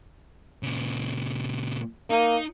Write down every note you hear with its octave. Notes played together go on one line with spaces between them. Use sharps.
A#2 C#3
A#3 D#4